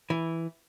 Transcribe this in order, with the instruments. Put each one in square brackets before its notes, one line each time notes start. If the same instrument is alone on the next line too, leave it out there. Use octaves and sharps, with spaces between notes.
[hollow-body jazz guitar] E3